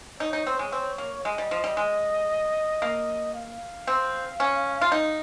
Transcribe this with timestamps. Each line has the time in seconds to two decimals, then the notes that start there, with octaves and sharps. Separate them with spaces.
0.20 D#4 C#5
0.33 D#4
0.47 C4
0.59 G#3
0.72 C4
0.98 A#3
1.25 G#3 D#5
1.38 G3
1.51 F3
1.64 G3
1.77 G#3
2.82 A#3
3.34 F5
3.87 C4
4.40 C#4
4.81 F4
4.92 D#4 F5